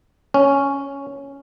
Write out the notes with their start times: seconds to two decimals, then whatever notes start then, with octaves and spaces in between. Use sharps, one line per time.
0.34 C#4